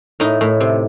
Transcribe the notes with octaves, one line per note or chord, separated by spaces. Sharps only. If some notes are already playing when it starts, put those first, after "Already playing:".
A2 D#4
A2
C3